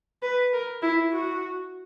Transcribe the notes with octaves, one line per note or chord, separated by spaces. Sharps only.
B4
A#4
E4
F#4